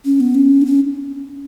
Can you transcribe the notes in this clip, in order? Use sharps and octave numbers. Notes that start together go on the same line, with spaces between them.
C#4
B3
C#4
D4
C#4